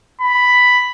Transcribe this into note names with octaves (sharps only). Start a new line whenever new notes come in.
B5